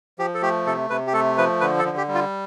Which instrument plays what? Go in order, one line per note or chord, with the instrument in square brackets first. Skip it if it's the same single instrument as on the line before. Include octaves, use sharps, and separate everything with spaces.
[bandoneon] F3 G4
A4
A3 G4
C3 A4
C3 B4
G4
A3 A4
F3 B4
D3 B4
A4
D3
G4
G3
F4